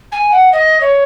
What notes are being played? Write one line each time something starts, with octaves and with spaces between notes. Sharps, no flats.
G#5
F#5
D#5
C#5